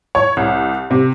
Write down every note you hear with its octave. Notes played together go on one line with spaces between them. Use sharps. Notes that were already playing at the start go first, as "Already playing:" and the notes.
C#5
C2
C3